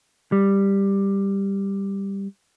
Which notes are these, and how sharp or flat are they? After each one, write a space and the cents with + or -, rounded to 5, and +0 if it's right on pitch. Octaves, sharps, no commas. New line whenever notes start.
G3 +10